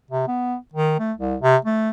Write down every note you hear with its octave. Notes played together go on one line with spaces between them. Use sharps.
C3
B3
D#3
A3
C2
C3
A3